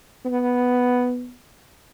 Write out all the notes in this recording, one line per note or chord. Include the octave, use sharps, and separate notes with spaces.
B3